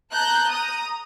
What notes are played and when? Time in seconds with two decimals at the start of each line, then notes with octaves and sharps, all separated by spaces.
0.12 A5 A#5 F#6 G6
0.49 A#5 D#6